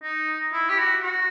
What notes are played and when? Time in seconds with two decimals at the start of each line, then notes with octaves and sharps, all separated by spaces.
0.03 D#4
0.53 E4
0.70 G4
0.78 F#4
1.02 F#4